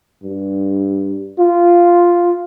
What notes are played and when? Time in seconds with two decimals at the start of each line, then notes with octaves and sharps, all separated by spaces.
0.23 G2
1.39 F4